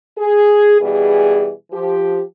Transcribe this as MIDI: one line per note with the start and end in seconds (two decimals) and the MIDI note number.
0.18 0.78 68
0.81 1.52 47
0.81 1.52 52
0.81 1.52 55
0.81 1.52 68
1.72 2.22 53
1.72 2.22 67